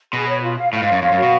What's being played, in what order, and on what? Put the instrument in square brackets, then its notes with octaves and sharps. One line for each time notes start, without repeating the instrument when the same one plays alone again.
[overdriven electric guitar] B2 [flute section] G#4
[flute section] C#5
F4
F5
[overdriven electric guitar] A2 [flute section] F5
[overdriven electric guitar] G#2
[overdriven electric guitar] F#2 [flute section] C#5
[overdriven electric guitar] F2 [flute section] F5
[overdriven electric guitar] F#2
[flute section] F#4
[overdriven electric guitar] B2